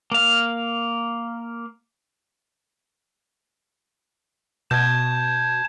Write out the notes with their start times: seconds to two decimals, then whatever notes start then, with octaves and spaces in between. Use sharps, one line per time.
0.12 A#3 F5
4.71 B2 A5 G6 G#6